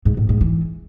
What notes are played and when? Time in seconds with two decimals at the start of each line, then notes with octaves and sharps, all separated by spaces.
0.05 G#2
0.17 A2
0.29 G#2
0.41 E3